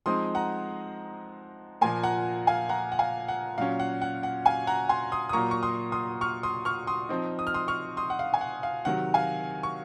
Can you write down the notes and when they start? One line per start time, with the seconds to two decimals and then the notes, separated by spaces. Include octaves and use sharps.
0.06 F3 G#3 C4 D#4 C6 D#6
0.35 F#5 A#5
1.81 A#2 F3 A#3 G#5 C6
2.03 F#5 A#5
2.47 F5 G#5
2.69 F#5 A#5
2.92 F#5
2.99 F5 G#5
3.28 F#5
3.58 A#2 F#3 C#4 F5
3.80 F#5
4.02 F#5
4.23 F#5
4.45 F5 G#5
4.67 F#5 A#5
4.89 G#5 C6
5.12 C6 D#6
5.29 D#6
5.33 A#2 F#3 A#3 A#5 C#6
5.51 C#6
5.63 C6 D#6
5.92 C6 D#6
6.21 C#6 F6
6.43 C6 D#6
6.65 C#6 F6
6.87 C6 D#6
7.09 F3 C4 D#4
7.39 D#6
7.47 F6
7.54 C6 D#6
7.68 C#6 F6
7.97 C6 D#6
8.10 F#5
8.19 F5
8.34 G#5
8.41 F#5
8.63 F5
8.85 C3 D#3 F#3 F#5
9.14 F5 G#5
9.63 C#6